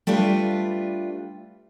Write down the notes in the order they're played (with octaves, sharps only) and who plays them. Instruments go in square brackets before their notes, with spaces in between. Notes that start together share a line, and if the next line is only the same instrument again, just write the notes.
[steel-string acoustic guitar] G3 A3 D4 F4 B4